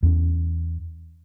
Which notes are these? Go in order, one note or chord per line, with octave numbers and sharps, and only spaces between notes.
E2 A3 C#4